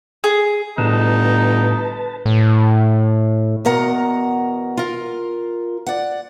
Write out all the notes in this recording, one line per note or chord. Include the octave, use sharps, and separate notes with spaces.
G#4
G1 A2 D#4 B4 A5
A2
E2 B2 A#4 F#5 A#5
F4 A#4
D5 F#5